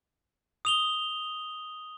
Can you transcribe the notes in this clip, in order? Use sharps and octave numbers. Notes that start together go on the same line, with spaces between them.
D#6 F7 G7